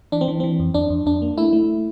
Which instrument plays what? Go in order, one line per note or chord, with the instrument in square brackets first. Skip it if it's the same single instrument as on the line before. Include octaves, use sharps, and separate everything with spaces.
[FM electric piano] E3 D4
C4
E3
E3 C4
F2
F2 D4
F2
F2 D4
A#3
A3 E4
A3